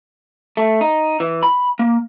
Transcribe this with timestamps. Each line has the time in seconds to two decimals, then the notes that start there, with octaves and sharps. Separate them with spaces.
0.57 A3
0.81 D#4
1.20 E3
1.43 B5
1.79 A#3